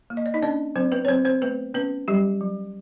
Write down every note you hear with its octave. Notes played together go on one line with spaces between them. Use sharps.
A#3
D#5
D5
D#4 D#5
C#4 D4 D5
F#3 C4 C5
B3 B4
C#5
F#3 C4 C5
C4 C5
A3 B3 B4
B3 C#4 B4
F#3 G3 G4
F#3